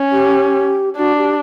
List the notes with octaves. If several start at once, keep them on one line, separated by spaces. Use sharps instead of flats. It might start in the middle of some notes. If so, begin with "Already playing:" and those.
Already playing: C#4
G4
D4 F#4
G4